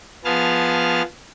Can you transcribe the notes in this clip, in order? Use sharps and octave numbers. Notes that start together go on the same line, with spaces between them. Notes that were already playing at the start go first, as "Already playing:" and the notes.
F3 B3 G#4 A5 F6